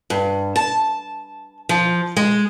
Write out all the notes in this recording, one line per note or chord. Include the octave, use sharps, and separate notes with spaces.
G2
A5
F3
G#3